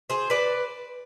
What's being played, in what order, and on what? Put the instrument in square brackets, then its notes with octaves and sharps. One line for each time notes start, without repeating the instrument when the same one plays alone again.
[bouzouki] G#4 C5
B4 D5